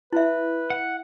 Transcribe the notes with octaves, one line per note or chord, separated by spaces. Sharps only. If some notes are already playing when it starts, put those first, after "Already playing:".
E4 B4 E5
F#5